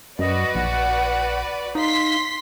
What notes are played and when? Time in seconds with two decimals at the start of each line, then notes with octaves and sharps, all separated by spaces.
0.19 F#2 F#4 B4 D5 D#5
0.55 A#1 F#5
1.75 D#4 F5 C6 B6